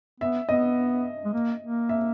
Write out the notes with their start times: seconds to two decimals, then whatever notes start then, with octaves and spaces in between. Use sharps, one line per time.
0.20 B3 E5
0.49 B3 D#5
1.25 G#3
1.33 A#3
1.62 A#3
1.89 E5